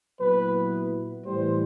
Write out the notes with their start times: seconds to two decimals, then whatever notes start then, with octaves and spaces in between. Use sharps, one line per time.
0.21 A#2 F#3 B3 E4 B4
1.25 A2 E3 G3 C5